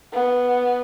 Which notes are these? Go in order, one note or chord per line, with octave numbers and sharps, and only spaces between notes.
B3